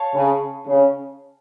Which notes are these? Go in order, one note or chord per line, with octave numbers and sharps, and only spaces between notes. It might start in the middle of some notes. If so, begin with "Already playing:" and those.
Already playing: C#5 F5 A5
C#3
C#3